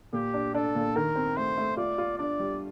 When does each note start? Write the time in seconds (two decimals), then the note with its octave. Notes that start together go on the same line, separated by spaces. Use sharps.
0.13 A#2 G4
0.34 D4
0.55 D4 A4
0.75 A#2
0.96 D#3 A#4
1.15 C4
1.37 A3 C5
1.57 A3
1.77 F4 D5
1.98 F4
2.18 D4 D5
2.39 G3